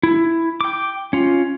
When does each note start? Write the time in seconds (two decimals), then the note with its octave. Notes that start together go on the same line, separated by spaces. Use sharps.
0.03 E4
0.61 G5 D6
1.13 C#4 F4